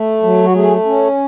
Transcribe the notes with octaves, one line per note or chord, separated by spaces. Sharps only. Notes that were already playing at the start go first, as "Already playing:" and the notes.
Already playing: A3
F#3
F#4
A3 G#4
C#4